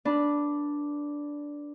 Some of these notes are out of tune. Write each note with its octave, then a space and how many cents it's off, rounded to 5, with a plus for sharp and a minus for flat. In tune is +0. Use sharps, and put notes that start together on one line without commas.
D4 -5 B4 -20